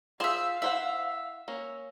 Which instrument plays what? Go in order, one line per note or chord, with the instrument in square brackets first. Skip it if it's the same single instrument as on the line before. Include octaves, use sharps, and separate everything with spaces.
[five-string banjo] F4 G#4 [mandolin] C5 E5 [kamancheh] F5
[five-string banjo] E4 C5 F#5 [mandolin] E5
[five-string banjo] A#3 C#4